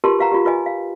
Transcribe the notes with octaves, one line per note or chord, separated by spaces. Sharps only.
F4 G4 A#4 B4 A5 C6
G4 B4 F5 F#5 A#5
F4 G4
F4 B4 D#5 G#5
F5